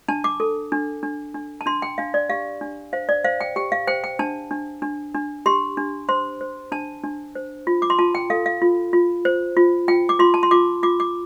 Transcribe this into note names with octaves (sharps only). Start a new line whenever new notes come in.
D4 A5
D6
A4
D4
D4
D4
A5
D4 C6
G5
D4 F5
D5
G4 F5
D4
C5 F5
D5
C5 F5
G5
G4 G5
F5
C5 G5
G5
D4 A5
D4
D4
D4
G4 C6
D4
C5 C6
C5
D4 A5
D4
C5
F4
D6
C6
F4 A5
G5
A4 F5
F5
F4
F4
C5
F4
F4 G5
D6
F4 C6
A5
C6
F4 D6
F4 D6
D6